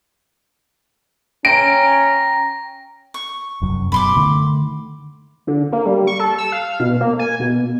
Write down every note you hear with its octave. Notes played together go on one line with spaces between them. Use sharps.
C#4 G5 A#5 A#6 D7
C#6
F1 F#2
F#2 B2 B5 C6 D6
D3 D#3 A3
D3
A#3
G3
C#6
A4
E6
F5
B2
A#3
G#5
B2